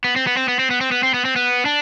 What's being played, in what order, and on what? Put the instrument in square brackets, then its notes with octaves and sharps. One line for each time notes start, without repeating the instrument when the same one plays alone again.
[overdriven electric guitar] B3
C4
B3
C4
B3
C4
B3
C4
B3
C4
B3
C4
B3
D4